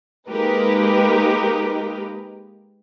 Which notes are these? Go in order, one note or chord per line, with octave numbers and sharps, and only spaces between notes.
G#3 A#3 D#4 G4 A#4 B4